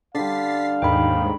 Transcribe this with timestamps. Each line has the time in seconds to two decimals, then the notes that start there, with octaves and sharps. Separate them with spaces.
0.15 D3 G3 F5 A6 B6 C7
0.82 D#2 G#2 D#3 G5 B5